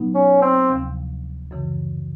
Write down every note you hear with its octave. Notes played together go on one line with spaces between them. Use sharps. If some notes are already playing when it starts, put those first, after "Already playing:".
Already playing: B2 F#3 B3 D#4
C#4
C4
D2 C3 F3
F#2 C#3 E3